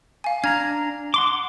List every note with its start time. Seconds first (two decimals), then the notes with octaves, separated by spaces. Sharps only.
0.24 F5 G#5
0.44 D4 G#5 A#5 F6 G#6
1.14 F#5 C6 D6